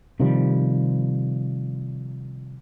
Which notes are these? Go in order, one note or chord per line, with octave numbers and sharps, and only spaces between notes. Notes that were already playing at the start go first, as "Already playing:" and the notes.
C3 D#3 F3 G3